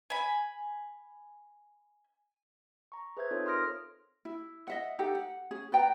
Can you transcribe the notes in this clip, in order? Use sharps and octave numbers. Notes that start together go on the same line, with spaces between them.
G#5 B5
A#5 C#6
G#4 B4 C5 E5 G6 G#6
C4 D#4 F4 A4 C5 C#5
A#4 C6 D#6 F6 A#6 D7
E4
D#5 E5 F#5
D#4 G4 A4 F#5
F#5
C#4 G#4
B4 D5 G5 A#5